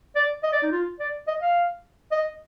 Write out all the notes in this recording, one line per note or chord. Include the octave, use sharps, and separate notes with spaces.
D5
D#5
D5
D#4
F4
D5
D#5
F5
D#5